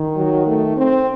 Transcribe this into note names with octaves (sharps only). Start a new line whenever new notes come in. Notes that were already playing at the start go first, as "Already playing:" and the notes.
Already playing: D#3
F#3
A3
C4